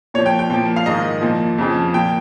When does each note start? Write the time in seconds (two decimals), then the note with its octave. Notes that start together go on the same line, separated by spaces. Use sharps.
0.14 A#2 C#5
0.18 F3
0.26 G5
0.39 G5
0.50 A#2 F3
0.76 F5
0.86 G#2 D#3 D#5
1.22 A#2 F3
1.58 F2 C#3 F3
1.94 A#2 F3 G5